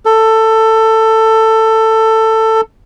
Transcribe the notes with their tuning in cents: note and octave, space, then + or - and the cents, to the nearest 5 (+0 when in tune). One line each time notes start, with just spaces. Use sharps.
A4 +15